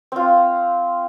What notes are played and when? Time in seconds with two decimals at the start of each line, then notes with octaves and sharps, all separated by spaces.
0.12 C4 F4